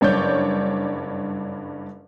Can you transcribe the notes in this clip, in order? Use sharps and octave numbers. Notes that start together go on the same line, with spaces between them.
F#1 G2 C#5 D5 G6